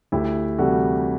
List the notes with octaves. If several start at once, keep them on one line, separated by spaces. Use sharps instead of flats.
D2 E4 G4
C3 E3 G3 F#4 A4